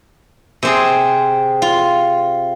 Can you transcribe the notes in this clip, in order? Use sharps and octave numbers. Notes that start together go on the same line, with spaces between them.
C3 C4 G#4
F4